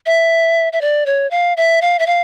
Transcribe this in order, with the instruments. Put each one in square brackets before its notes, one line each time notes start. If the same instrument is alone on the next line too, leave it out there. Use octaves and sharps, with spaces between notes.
[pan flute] E5
E5
D5
C#5
F5
E5
F5
E5
F5